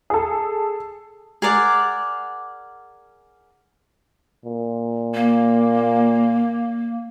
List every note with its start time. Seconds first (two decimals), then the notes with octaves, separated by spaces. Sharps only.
0.10 G#4 A4
1.42 G#4 A#4 D5 F#5
4.46 A#2
5.14 A#3